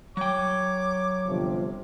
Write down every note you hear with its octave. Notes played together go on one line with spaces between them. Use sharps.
F#3 C#5 G5 D6
G1 C3 F3